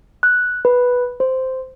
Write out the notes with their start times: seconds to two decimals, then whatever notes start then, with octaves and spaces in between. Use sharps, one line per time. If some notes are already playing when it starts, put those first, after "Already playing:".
0.23 F#6
0.65 B4
1.20 C5